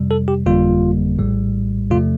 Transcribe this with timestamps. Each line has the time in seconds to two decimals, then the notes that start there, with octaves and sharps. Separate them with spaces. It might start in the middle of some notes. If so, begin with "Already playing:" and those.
Already playing: F2 C3 G3
0.11 A4
0.28 G4
0.46 G1 F2 D3 G3 A#3 F4
1.18 A#1 A2 G3
1.90 E2 C3 F3 A3 F4